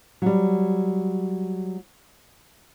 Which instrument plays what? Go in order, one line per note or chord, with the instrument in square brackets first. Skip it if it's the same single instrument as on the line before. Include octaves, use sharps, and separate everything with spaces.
[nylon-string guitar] F#3 G3